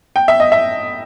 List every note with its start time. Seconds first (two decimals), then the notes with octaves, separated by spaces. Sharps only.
0.16 G5
0.28 E5
0.40 D#5
0.52 E5